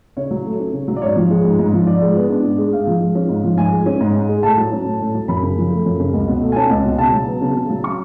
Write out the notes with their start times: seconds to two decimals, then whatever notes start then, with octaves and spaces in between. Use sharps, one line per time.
0.17 C#3 C#5
0.31 F#3
0.46 A3
0.60 C#4
0.73 C#3
0.88 F#3
0.96 D5
1.02 G#2 C#5
1.16 F3
1.31 G#3
1.45 G#2
1.59 G#2
1.73 F3
1.87 G#2 D5
2.02 G#3
2.16 B3
2.30 D4
2.44 G#2
2.58 G#3
2.73 G#2 F5
2.87 F3
3.01 G#3
3.15 C#4
3.29 G#2
3.44 F3
3.58 G#2 G#5
3.72 G#3
3.86 C#4
4.01 G#2
4.14 G#2
4.29 G#3
4.43 A2 A5
4.57 F#3
4.72 C#4
4.85 A2
5.00 A2
5.14 F#3
5.28 F#2 B5
5.43 C#3
5.57 F3
5.71 A3
5.85 F#2
6.00 C#3
6.14 C#2
6.27 B2
6.42 A3
6.52 G#5
6.56 C#4 A5
6.70 C#2
6.85 B2
6.98 C#3 A5
7.13 F#3
7.27 B3
7.41 C#3
7.56 C#3
7.70 F#3
7.84 C#6